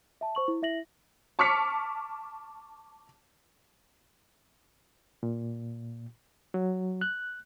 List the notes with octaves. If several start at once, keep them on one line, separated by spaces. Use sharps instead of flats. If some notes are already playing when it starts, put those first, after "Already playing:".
E5 A5
C5 C#6 F#7
E4
E4 E5 A#6 F#7
A5 C#6 D6 F6 B6 C#7
A#2
F#3
F#6